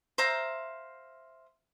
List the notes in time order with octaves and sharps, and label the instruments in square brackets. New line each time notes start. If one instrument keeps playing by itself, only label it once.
[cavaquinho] C5 E5 F5 A#5